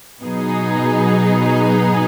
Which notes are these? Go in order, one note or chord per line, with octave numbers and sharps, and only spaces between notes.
B2 F#3 B3 D#4 G#4